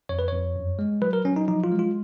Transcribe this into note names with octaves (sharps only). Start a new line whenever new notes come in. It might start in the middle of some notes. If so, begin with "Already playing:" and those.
F2 C#5
B4
F2 C#5
F#2
G#3
F#3 B4
A#4
F#3 C#4
D#4
F3 D#4
F4
G#3
F4